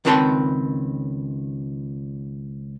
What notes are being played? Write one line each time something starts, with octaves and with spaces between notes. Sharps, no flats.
C#2 D#3 C4 B4 A5 C6